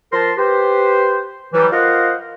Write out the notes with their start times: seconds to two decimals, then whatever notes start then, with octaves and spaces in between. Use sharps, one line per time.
0.12 F3 A#4 A5 C6
0.38 G4 B4 C5
1.54 E3 F#3 G3
1.72 F4 A#4 C5 D#5 F5 F#5